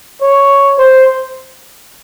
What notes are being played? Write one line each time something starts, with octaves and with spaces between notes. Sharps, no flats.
C#5
C5